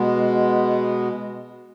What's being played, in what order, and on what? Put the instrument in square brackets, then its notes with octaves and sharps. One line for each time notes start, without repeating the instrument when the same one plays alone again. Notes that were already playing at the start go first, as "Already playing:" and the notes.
Already playing: [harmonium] B2 G#3 B3